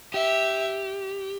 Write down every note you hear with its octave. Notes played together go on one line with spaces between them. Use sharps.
G4 E5